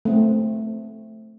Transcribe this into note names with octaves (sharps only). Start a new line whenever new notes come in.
A3 C4